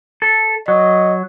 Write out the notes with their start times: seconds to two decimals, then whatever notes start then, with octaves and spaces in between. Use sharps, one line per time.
0.22 A4
0.68 F#3 D#5